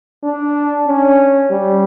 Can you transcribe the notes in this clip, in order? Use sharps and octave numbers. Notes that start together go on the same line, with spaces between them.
D4
C#4
G3